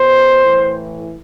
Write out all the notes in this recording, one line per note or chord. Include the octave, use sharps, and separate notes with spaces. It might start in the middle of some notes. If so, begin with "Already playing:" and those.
Already playing: B2 C5
A2 E3